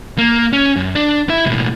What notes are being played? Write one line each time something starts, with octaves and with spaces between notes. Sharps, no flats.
A#3
C#4
F#2
D4
E4 E5
B1 A2